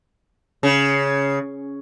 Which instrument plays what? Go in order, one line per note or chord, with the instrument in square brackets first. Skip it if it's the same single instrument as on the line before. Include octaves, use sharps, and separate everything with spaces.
[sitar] C#3